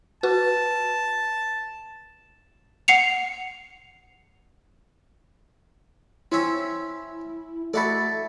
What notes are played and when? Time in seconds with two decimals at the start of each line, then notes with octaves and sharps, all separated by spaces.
0.23 F#4 B4 A5
2.88 F#5 C7 C#7 F7
6.32 C4 C#4 E4 E5
7.74 A3 E4 F#4 A4 D5 E5 A6